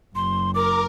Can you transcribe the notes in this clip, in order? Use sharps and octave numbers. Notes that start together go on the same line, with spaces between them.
F#1 C6
A#4 D6